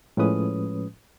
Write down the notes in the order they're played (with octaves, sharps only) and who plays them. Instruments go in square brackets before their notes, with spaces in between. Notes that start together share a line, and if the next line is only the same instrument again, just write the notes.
[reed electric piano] A2 F3 G#3 C#4 B4 D#6